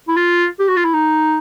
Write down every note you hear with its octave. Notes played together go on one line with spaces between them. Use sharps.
E4
F4
G4
F#4
F4
E4
D#4